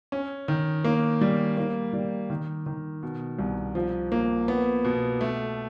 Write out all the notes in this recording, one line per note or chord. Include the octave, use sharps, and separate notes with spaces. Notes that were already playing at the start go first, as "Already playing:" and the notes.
C#4
D#3
A#3
G3
A#3
G3
D#3
D#3
B2
C2
F3
A#3
B3
B2
A3